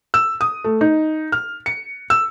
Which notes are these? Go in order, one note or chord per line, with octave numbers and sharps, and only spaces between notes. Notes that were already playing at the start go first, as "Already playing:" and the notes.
E6
D#6
A3
D#4
F6
C#7
E6